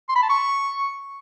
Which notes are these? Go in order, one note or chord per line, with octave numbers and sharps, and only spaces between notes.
C6
B5
A5
C#6